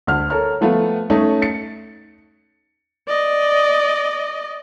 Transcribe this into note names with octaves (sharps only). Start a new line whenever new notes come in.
D2 F6
A4 A#4 C#5 F6
F3 A3 B3 F4 A4
A3 C#4 D#4 C#5
A6 C#7
D5 D#5